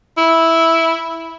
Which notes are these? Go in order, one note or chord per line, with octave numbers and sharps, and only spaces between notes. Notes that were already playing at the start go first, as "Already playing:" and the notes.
E4